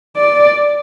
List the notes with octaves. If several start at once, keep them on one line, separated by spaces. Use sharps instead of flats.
D5